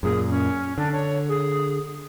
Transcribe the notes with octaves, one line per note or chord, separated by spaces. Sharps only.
F#2 A#2 G#4
C#4
D3 D4
C#5
G#4